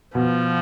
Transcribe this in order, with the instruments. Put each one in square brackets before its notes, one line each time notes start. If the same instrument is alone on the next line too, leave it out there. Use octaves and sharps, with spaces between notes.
[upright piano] B2 [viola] F3